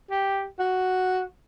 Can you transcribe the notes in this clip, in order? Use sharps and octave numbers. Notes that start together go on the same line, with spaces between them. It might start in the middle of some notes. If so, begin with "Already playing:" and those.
G4
F#4